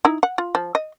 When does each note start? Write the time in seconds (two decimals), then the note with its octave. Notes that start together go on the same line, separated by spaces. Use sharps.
0.05 D#4 E4
0.23 F#5
0.38 F4
0.55 F3
0.75 D#5